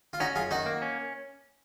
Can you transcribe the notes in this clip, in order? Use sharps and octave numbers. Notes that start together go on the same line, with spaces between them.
F4
C#4 D#4 F#4
F#2 F4 G#4
D#3 D#4 F#4
A#3
C#4